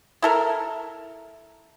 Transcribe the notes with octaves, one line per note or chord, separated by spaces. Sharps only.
E4 A4 A#4